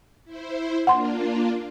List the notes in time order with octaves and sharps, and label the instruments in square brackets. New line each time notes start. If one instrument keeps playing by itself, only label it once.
[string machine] E4 C5
[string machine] A#3 D4 F4 [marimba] F#5 C6